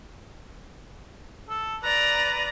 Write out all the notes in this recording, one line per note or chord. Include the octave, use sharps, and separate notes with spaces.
A4
B4 D5 A#5